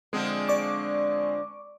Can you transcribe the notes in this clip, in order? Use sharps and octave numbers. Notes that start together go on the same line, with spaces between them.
D3 F3 G#3 C4 D4 G#4
D5 C#6 D6